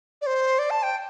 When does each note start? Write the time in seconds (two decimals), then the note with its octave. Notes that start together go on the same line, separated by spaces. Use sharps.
0.22 D5
0.26 C5
0.59 D5
0.70 A5
0.83 G5